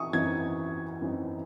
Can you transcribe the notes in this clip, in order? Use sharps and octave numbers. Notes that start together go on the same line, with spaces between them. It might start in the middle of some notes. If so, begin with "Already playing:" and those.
Already playing: E3 C#6 D#6
F#2 E3 C4 D#4 G#6
F#2 E3 C4 D#4